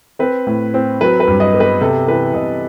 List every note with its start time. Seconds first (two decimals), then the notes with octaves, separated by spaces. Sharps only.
0.19 C4 B4
0.47 A2
0.74 C4
1.01 F#3 B4
1.20 B4
1.28 G2
1.40 D#5
1.54 B3
1.60 B4
1.81 C3 A4
2.07 E3 B4
2.34 C3 D#5